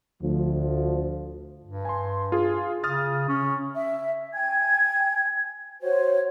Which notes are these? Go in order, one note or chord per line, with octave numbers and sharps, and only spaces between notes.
D2 F3
G2
G#5 C6
F4 G#4
C#3 D#6 F6 A6
C#4
E5
G5 G#5 G#6
F#4 C5 C#5